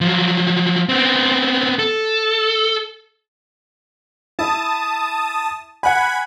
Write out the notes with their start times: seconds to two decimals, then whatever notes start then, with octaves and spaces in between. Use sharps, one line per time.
0.01 F3 F#3
0.89 B3 C4
1.79 A4
4.39 E4 A5 D#6
5.83 F#5 G#5 B5 F#6 G#6